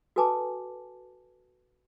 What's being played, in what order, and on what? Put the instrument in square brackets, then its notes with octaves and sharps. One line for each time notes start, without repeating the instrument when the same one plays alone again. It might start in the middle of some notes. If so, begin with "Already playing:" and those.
[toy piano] F#4 A4 B4 G#5 A5 D6